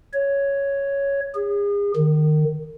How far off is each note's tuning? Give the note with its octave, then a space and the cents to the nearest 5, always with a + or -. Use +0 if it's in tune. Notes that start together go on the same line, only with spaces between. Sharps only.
C#5 +5
G#4 -40
D#3 -25